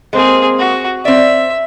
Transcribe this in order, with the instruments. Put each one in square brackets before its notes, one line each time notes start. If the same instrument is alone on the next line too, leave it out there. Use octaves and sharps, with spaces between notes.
[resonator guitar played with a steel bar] G#3 A#3 [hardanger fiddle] C4 G#4
[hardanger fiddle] F#4
[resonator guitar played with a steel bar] C4 D5 [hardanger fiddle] E5